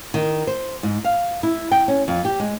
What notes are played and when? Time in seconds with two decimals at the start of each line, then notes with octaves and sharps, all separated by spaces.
0.14 D#3
0.47 C5
0.83 G#2
1.04 F5
1.43 E4
1.72 G5
1.88 C#4
2.08 F2
2.25 G4
2.40 G#3